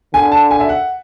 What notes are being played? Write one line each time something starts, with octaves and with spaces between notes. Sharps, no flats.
D3 G#5
A5
G#5
E5
F#5